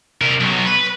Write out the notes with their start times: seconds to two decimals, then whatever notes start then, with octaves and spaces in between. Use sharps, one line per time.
0.21 C3 A#4
0.40 B1 F#3
0.66 B4